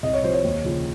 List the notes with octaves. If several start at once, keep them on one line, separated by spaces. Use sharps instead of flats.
C2 D#5
C#5
C3 F3 C5
C#5
D#2
C#3 F3